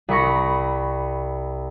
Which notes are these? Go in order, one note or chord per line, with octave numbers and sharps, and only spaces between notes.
C2 B5 C#6 A#6